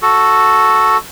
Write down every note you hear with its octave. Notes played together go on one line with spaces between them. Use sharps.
F#4 A4